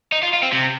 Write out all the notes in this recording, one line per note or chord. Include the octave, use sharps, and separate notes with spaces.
D#4
F4
F4
C4
C3